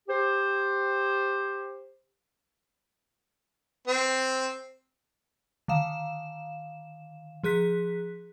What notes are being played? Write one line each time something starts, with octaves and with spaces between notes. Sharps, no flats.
G4 C5
C4
D3 D#3 F5 E7
F3 G#4 F#6 B6